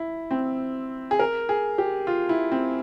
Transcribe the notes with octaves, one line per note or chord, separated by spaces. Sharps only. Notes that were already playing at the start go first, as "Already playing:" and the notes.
Already playing: E4
C4
G#4
A#4
G#4
G4
F4
E4
C4